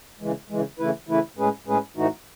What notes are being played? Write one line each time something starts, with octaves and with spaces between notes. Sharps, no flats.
C#3 E3 G#3
C#3 E3 G#3
C#3 E3 A3 E4 B4
C#3 E3 A3 E4 B4
A2 G#3 C#4 G#4 B4
A2 G#3 C#4 G#4 B4
A2 E3 A3 D#4 F#4